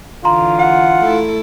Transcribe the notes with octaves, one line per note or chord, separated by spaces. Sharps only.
D3 E3 F4 A#5 C6
F#5
A3 E4 A4